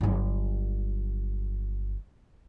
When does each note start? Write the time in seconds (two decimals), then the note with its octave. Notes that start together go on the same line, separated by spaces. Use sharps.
0.01 G1 F#3